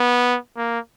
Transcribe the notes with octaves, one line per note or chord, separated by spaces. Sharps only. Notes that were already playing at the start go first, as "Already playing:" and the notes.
Already playing: B3
A#3